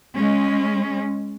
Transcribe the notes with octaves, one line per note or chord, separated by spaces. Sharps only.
G#3 C#4